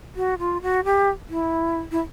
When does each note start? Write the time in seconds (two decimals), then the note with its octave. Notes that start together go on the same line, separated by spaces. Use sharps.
0.16 F#4
0.39 F4
0.62 F#4
0.84 G4
1.30 E4
1.92 E4